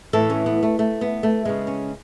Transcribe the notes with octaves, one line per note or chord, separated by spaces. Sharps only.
A2 E3 A3 A4
C#4
B3
A3
A3
B3
A3
C#3 G#3 B3
C#4